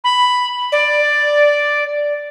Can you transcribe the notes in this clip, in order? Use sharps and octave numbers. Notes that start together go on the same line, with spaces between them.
B5
D5